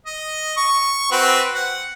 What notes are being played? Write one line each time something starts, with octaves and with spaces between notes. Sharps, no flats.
D#5
C#6
C4 F#4 B4
F#5